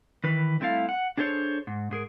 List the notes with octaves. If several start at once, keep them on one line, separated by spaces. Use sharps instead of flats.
D#3 E3 B4
G3 A3 C4 E4 A4 F5
F#5
D4 G#4 A4 C5 C#5
G#2
G#2 G#4 A#4